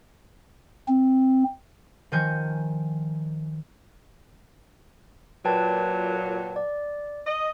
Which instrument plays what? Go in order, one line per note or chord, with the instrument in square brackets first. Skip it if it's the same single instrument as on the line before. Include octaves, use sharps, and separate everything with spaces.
[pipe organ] C4
[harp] D#3 F3 G#5 G6 A#6 C#7
[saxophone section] A#2 F#3 [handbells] B4 G5 A5
[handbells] D5
[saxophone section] D#5